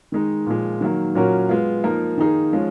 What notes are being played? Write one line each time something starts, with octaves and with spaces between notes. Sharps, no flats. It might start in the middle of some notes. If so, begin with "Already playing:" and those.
D#3 G#3 D#4
A#2 F3 G#3
D#3 F#3 A#3
A#2 F#3 C#4 F#4 A#4
G#3 B3 F4
F3 A#3 D#4 A#4
D#3 A#3 D#4 G#4
F3 G#3 C#4 F4